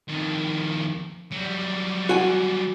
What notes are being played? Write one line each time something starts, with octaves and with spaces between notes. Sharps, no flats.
F2 D#3
F#3 G3
F#4 G#5